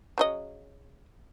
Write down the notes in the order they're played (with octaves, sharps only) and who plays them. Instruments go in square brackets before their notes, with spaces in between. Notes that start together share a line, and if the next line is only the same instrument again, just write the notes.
[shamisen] C#3 F#3 D#5